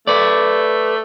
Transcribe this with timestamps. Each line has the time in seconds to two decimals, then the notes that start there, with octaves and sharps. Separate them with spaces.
0.07 A3 B4 D5